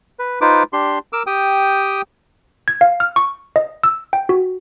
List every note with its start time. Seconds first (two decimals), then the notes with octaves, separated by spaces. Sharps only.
0.19 B4
0.41 D#4 F4 B4 C5 D6
0.73 D4 G4 C6
1.13 A#4 D6 E6
1.27 G4 G5 D#6
2.68 G#6
2.81 F5
3.00 F6
3.16 C#6
3.56 D#5
3.83 E6
4.13 G5
4.29 F#4